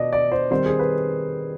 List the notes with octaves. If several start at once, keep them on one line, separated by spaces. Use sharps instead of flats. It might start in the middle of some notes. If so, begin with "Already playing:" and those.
Already playing: B2 B3 D5 D#5
D5
C5
D#3 G3 C4 C5
G#4
B4